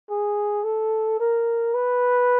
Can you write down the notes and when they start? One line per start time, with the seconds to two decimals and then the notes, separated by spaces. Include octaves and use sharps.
0.10 G#4
0.64 A4
1.20 A#4
1.74 B4